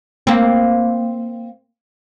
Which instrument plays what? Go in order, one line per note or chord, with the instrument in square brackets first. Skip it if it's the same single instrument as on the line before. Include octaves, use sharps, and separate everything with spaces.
[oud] A#3 C4